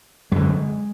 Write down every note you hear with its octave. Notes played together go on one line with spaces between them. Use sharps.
F#2 D3 G#3